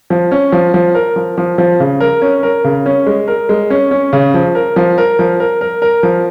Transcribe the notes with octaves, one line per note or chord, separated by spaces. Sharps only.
F3
C#4
F3
F3
A#4
F3
F3
F3
C#3
A#4
C#4
A#4
C#3
C#4
G#3
A#4
G#3
C#4
C#4
C#3
F3
A#4
F3
A#4
F3
A#4
A#4
A#4
F3